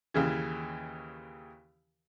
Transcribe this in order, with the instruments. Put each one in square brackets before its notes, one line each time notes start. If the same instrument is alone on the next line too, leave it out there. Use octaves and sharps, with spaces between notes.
[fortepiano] D#2 C#3 E3